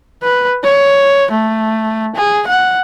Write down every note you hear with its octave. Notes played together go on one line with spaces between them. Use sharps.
B4
C#5
A3
G#4
F#5